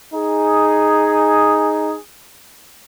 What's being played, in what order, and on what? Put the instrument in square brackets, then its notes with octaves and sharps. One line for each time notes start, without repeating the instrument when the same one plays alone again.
[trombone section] D#4 G#4